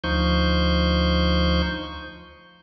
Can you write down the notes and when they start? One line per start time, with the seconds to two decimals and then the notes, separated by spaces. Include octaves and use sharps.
0.04 D2 F3 D#4 C5 C#6 G6